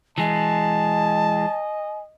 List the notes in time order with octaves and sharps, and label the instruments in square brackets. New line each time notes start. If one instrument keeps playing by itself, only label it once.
[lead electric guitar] E3 G#3 [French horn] D#5 [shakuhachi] G#5 [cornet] A5